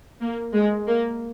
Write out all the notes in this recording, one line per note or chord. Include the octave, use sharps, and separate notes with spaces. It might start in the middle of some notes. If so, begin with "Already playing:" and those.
A#3
G#3
A#3